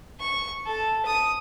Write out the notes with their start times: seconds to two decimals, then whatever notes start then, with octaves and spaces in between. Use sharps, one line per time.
0.20 C#6
0.66 A4
1.06 D#6